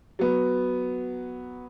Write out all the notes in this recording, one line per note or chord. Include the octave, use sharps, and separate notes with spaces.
F#3 B3